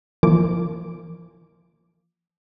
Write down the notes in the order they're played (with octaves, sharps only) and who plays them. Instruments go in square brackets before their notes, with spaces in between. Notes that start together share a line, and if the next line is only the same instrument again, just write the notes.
[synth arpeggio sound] E3 F3 A#3 D6